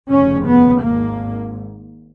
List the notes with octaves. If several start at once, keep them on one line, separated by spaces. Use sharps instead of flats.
F1 D#2 C#3 C#4
B3
G#1 G#2 A#3